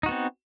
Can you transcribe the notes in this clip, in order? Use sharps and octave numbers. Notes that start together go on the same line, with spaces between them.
B3 C4 D#4 F#4